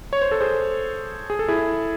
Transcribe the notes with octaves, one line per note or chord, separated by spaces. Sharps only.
C#5
C5
A4
G#4 C5
G#4
A4
E4 G#4